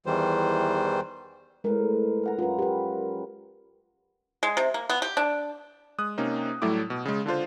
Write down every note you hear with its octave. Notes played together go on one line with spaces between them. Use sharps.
E2 D#3 E3 G3 C5
A2 G#3 A#4 B4 C6
A#4 F#5 A#5
F#2 F4 B4
G4 B4
G#3
C3
A#3
B3
G4
D4
G#3 D#6 F#6
C3 A#3 C#4 D#4
A2 F#3 G3 A3 E4 D6
B2
C#3 G#3
D3 D4 F4 C5